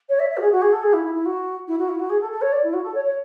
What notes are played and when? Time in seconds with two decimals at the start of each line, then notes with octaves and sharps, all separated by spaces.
0.09 C#5
0.19 E5
0.30 E5
0.37 F#4
0.41 G#4
0.52 F#4
0.61 G#4
0.72 A4
0.83 G#4
0.93 E4
1.04 E4
1.14 E4
1.25 F#4
1.67 E4
1.78 F#4
1.88 E4
1.99 F#4
2.09 G#4
2.20 A4
2.31 A4
2.41 C#5
2.52 D5
2.63 E4
2.73 F#4
2.83 A4
2.94 C#5
3.04 C#5